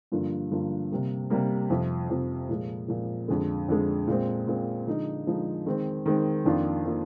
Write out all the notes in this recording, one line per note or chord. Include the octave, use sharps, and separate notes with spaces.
G2 D3 F3 A#3 F4
G2 D3 F3 A#3 F4
C3 G3 A#3
C3 G3 A#3
F2 C3 F3
F2 C3 F3
A#2 F3 G#3
A#2 F3 G#3
F2 D3 G#3
F2 D3 G#3
A#2 G#3 C4
A#2 G#3 C4
D3 F3 G#3 D#4
D3 F3 G#3 D#4
D#3 G#3 C4
D#3 G#3 C4
F2 D#3 A#3 D4 F4
D#3 A#3 D4 F4